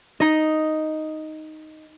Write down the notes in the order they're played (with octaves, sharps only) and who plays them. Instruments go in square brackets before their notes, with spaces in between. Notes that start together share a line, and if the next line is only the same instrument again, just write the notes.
[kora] D#4 D#5